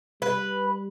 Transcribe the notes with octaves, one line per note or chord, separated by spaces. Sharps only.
G3 B4